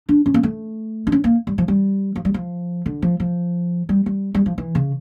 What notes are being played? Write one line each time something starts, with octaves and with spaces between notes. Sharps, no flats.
D4
C#4
A#3
A3
D4
C#4
A#3
G3
F3
G3
F3
G3
F3
D3
F3
F3
G3
G3
G3
F3
E3
C#3